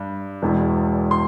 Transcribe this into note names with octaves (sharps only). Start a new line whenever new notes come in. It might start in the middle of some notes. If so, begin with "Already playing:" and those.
Already playing: G2
E1 E2 E3
C6